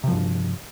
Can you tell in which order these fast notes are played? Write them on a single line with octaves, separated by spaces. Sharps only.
C3 F3 G2